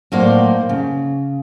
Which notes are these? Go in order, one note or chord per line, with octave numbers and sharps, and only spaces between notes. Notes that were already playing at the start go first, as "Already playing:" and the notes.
A2 F#3 A#3 D#4 C5 D5
C#3